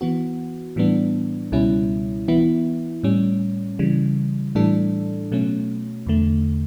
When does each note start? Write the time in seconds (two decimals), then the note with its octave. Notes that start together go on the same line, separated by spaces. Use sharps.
0.01 E3 B3 F#4
0.76 A2 E3 G3 B3 D4
1.52 C#2 B2 G3 C#4 E4
2.28 E3 B3 E4
3.03 A2 G3 C#4
3.79 C#3 E3 G3
4.55 A2 E3 G3 D4 A4
5.32 B2 F#3 A3 C#4
6.06 E2 D3 A3